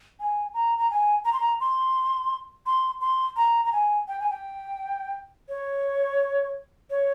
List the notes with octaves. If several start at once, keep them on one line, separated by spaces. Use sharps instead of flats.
G#5
A#5
A#5
G#5
A#5
C6
A#5
C6
C6
C6
A#5
A#5
G#5
G5
G#5
G5
C#5
C#5